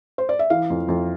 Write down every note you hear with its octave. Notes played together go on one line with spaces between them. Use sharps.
C5
D5
E5
E3 F5
F2
F2